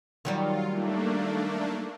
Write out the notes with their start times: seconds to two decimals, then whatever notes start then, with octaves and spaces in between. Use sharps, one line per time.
0.25 D#3 F#3 G3 F4
0.67 A3 A#3 D4